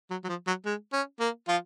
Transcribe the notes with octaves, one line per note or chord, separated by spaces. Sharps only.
F#3
F#3
F3
F#3
G#3
C#4
A#3
F3 F4